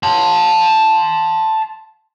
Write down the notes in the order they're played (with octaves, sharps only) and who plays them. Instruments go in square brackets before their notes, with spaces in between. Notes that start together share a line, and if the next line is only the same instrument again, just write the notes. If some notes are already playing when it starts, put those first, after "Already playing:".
[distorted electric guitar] A5 C6